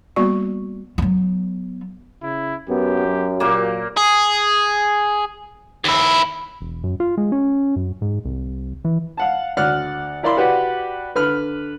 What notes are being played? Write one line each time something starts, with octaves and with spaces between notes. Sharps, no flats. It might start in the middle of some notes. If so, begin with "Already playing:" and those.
G3 A#3 B3 F#4 D5 C#6
F#3 B3
C#3 E4
F#2 B3 G4
F#3
A#2 A#3 G4
G#4
D#2 E4
E1
F#2
F4
G#3
C#4
F#2
G#2
C2
E3
F5 F#5 A5
D2 D5 F#5 F6 F#6
E4 A#4 D5 F5 B5 C6
F#4 G4 B4 D5 F#5
D3 B4 B5 F6